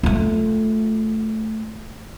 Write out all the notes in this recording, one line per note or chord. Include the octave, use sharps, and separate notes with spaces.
A3 F4